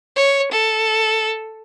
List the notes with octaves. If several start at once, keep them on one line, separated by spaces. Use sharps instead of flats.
C#5
A4